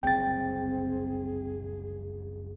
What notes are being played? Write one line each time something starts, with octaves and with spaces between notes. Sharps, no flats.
F#1 C2 F2 C4 G#4 G5 A6